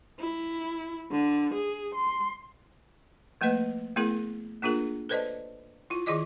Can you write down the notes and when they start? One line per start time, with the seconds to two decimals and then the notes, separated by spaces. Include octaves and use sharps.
0.20 E4
1.11 D3
1.54 G#4
1.95 C6
3.41 F3 A3 A#3 B4 D#5
3.96 A3 B3 E4 G#4 A#4
4.62 A#3 D4 F4 G#4 A#4
5.09 A4 B4 C5 D5 D#5 A5
5.90 E4 F4
6.06 D#3 E4 G#4 D5 D#5 D6